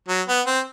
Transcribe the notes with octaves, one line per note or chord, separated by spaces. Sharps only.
F#3
B3
C4